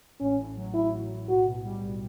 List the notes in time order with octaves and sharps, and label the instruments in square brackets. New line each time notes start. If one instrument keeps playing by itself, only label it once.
[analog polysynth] A1 [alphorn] C#4
[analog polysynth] A2
F#3
[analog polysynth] A1 [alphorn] E4
[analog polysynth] A1
A2
[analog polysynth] B1 [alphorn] F#4
[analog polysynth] B2
G3
B1